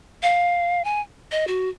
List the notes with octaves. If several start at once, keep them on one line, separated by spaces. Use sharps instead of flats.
F5
G#5
D#5
F#4